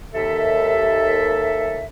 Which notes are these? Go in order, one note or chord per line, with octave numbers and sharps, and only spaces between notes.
D#2 A4 E5